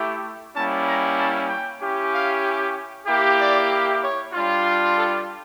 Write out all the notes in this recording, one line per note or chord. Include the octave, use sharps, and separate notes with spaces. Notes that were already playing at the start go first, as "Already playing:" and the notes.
Already playing: A3 E4 G4
G3 A#3 C#4 E4 A5
A#5
A5
G5
C#4 E4 G4
F5
A#3 E4 G4
D5
C#5
G3 D4 F4
A4